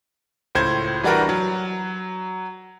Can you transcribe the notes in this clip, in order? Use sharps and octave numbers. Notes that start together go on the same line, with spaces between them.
C#2 A2 C5 G6 G#6
E3 G3 D4 F#4 A#4 B4
F#3